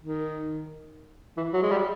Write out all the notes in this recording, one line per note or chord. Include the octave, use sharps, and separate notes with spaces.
D#3
E3
F#3
G#3
G3